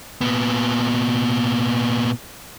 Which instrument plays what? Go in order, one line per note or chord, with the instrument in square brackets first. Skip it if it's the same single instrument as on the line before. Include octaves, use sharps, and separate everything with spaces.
[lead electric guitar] A#2 B3